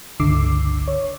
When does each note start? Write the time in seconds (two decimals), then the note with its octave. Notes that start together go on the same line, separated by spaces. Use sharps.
0.20 G1 C#2 D3 D6 E6 C7
0.88 C#5